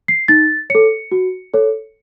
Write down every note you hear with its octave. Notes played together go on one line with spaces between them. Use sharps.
C7
D#4 A6
A4 C#5 C#7
F#4
A4 C#5